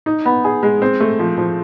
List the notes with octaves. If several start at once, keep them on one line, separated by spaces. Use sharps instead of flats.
D#4
B3
G#4
G#3
C4
A3
F3
F3